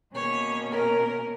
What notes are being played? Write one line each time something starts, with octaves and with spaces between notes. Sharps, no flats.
B2 A#3 C#4 C#5
A#4